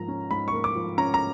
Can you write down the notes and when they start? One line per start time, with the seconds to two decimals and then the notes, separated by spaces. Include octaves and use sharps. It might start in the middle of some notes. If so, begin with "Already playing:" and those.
Already playing: G#2 F3 A#3 A#5
0.08 C#4
0.31 G#2 B5
0.48 C#6
0.53 A#3
0.64 D6
0.75 F3
0.98 C#4 A#5
1.14 A#5